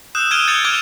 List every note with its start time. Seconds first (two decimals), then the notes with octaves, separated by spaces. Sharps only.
0.15 D#6 E6 F#6 G6 E7
0.31 D#6 F6 G#6 D7 D#7 G7
0.47 F#6 G6 A6 C#7 F7 G7
0.65 D6 F6 F#6 G#6 D7 G7